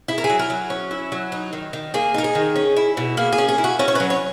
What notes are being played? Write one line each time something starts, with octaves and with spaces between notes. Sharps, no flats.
E4 G#4
A#4
G#4
F#3
A#4
F#3
C#4
E4
F#3
D#4
D#3
D#3
A#3 G#4
D#4 A#4
G#4
D#3
C#4
E4
B2
A#3 G#4
G#4
C#4
G#4
E4
F#4
C#4 A#4
C#5
F#3 B4
C#5